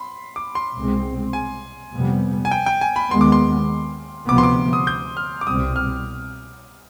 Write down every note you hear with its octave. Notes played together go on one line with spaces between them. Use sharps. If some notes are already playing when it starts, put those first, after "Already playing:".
Already playing: B5 C6
D6
C6
C2 B2 G#3 C4
G#5
F2 C3 G3 B3
G#5
G5
G5
G#5
B5
D#2 D#3 G#3 B3 C6
D6
C6
D2 C3 F3 B3 D6
C6
D6
D#6
G6
F6
D6
C2 B2 G3 C4 D#6
F6